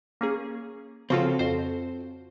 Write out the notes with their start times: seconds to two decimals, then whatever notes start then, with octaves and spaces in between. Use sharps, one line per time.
0.21 A#3 C#4 G#4
1.10 C#3 F3 C4 F4 F#4 A4
1.39 F2 C5